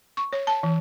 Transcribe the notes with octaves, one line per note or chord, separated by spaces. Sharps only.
C#6
C#5
A5
E3